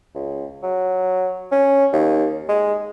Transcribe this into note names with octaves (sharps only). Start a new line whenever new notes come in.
C#2
F#3
C#4
D#2
G#3